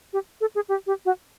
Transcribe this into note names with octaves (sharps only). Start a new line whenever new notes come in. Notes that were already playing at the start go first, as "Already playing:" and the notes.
G4
A4
G#4
G4
G4
F#4